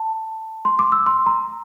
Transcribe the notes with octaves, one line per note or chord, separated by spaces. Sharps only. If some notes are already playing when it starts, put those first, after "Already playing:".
Already playing: A5
C6
D6
E6
C6
A#5